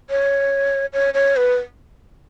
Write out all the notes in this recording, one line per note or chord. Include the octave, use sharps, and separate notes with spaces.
C#5
C#5
C#5
B4